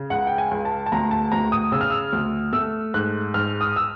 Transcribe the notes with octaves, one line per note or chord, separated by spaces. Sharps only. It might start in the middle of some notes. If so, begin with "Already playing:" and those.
Already playing: C#3
C#2 F#5
G5
G#5
C#2
A5
A5
D2 A#5
A5
D2 A#5
D#6
C#3 E6
F6
E6
D2
A3 E6
G#2 F#6
G#2 F6
D#6
E6